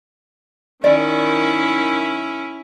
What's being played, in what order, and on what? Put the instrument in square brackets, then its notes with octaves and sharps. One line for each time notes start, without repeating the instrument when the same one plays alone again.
[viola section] D#3 [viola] C#4 [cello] E4 [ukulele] D5